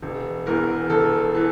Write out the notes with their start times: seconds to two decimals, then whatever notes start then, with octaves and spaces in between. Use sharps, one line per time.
0.02 E1
0.46 E2 E3 A#4
0.90 E1 A4
1.35 E3